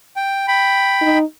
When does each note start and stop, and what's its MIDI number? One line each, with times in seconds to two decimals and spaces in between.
0.16 0.47 79
0.48 1.18 79
0.48 1.18 83
1.02 1.23 63